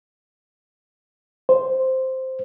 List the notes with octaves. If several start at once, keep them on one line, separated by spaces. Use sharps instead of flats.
C5